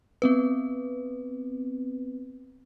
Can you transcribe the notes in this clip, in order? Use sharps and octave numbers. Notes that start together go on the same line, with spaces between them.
B3 C4 B4